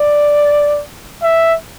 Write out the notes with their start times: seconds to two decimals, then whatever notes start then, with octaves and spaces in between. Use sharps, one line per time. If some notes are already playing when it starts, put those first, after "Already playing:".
Already playing: D5
1.23 E5